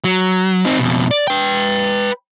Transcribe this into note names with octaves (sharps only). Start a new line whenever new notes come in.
F#3
C4 D#4
F2 B2
D5
B4 G5